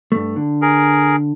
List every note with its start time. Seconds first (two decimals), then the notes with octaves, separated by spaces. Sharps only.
0.12 G2 A3
0.36 D3
0.62 G#4 A#4